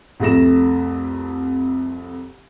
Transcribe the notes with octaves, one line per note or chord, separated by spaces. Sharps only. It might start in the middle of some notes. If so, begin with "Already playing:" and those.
C2 F2 A3 A#6 E7